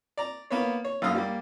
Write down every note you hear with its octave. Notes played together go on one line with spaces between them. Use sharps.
D5 A#5
A#3 B3 B4 C#5
C#5
B1 F#2 A#3 F5 D#6 E6
G3 A#3